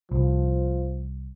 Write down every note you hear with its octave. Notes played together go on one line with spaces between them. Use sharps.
C2 F3